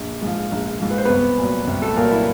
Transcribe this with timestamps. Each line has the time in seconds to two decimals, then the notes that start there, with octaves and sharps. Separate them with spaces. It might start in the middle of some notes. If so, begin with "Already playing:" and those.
Already playing: A#1
0.22 G#2 F3
0.52 A#1
0.80 G#2 F3
0.90 B4
0.98 C5
1.05 C2 B3 B4
1.38 A#2 F#3
1.67 C2
1.82 A3 A4
1.96 A#2 F#3 A#3 A#4
2.11 E4 E5